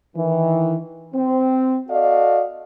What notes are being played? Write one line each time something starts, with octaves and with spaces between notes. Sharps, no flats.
D#3 E3
C4
F#4 A4 D5 D#5 F5